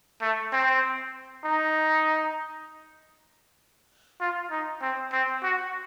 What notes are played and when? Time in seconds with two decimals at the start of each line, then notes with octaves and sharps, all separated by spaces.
0.22 A3
0.52 C4
1.44 D#4
4.20 F4
4.51 D#4
4.82 C4
5.12 C4
5.43 F#4